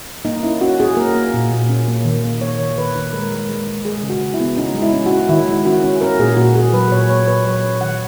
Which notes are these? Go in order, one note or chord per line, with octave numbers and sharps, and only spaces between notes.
A#3 D#4
C#4 E4
C#4 F#4
C#4 G#4
A#3 A#4
A#3
A#2
A#2
C#4
A#3
D#3
A#3
A#3 C#5
D#3
D#3 B4
D#3
G#3 A#4
G#3
G#3
G#3
G#3 G#4
C#3
F#4
C#3
E4
B3
C#4 D#4
G#3
E4
C#4
F#4
C#4
D#3 E4
G#3
C#4 F#4
C#4
C#4 A#4
A#2 G#4
A#2 F#4
A#2 G#4
F#3 B4
A#2 C#5
A#2 C#5
A#2 B4
F#3 C#5
C#4
D#3 F#5